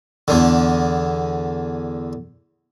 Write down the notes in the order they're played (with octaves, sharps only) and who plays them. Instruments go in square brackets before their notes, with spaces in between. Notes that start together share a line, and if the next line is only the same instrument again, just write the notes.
[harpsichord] E2 D3